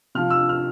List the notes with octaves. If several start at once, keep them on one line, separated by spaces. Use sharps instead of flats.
C3 F3 F6
E6
F6